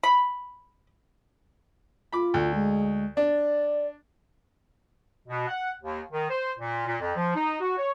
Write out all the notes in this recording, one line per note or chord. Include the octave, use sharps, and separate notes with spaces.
B5
F4 B5 D6
D2
G#3
D4 D5
B2
F#5
D#2
D#3
C5
A#2
A#2
F2
F3
D#4
F#4
C#5